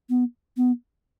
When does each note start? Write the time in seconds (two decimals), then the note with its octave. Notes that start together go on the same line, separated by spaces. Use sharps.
0.10 B3
0.57 B3